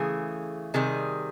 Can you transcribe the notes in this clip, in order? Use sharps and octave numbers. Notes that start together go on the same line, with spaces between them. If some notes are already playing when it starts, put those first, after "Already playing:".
Already playing: C#3 E3 A3 G#4
C3 D#3 G3 G#4